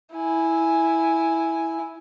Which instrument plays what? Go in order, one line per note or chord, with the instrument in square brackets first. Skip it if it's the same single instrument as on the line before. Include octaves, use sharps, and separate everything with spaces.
[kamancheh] E4 G#5